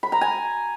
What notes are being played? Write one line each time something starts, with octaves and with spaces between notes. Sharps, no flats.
B5
A#5
G#5